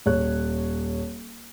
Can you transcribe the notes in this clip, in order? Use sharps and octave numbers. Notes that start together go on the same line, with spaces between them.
D#1 C#5 F#6